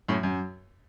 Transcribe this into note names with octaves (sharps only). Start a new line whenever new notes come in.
F#2 A2
F#2